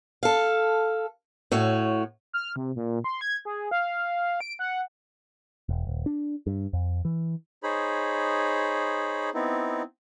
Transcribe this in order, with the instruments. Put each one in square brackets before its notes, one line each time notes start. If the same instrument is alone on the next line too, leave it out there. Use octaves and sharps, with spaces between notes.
[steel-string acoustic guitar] A4 F5
A2 F#4 C#5
[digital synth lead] F6
C3
A#2
C6
G#6
G#4
F5
D7
F#5
[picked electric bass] E1
D#1
D4
G2
F2
E3
[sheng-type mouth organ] D#4 G#4 C5 C#5 B5
B3 C4 D#4 E4